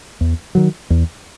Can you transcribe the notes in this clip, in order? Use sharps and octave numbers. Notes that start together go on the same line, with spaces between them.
E2
D#3 F#3
E2